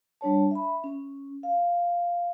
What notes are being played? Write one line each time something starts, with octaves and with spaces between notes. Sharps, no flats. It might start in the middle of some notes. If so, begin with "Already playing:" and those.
G3 D4 C#5 A5
E5 B5
C#4
F5